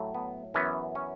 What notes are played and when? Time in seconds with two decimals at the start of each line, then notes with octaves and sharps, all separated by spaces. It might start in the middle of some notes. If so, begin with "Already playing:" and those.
Already playing: A2 F#3 A3
0.14 B3
0.54 F#2 E3 B3 C#4
0.95 C#4